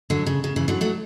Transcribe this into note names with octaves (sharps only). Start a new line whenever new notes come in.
D3 F#3
C#3
C#3
C#3 E3
D3 F#3
F#3 A3